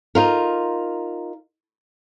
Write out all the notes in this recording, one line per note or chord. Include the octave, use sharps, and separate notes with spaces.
D#4 F4 A#4